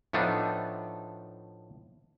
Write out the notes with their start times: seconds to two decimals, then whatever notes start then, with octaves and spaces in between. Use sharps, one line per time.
0.13 A2 F3 A3 B3 D4 D#4